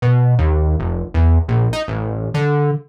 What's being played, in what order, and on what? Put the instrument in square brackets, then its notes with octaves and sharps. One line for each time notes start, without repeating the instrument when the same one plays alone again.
[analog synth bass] B2
D#2
F1
E2
A#1
D#4
A1
D3